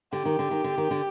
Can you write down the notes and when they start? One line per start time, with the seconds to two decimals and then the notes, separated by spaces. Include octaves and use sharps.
0.13 D3 G4
0.25 D#3
0.39 D3
0.51 D#3
0.64 D3
0.78 D#3
0.91 D3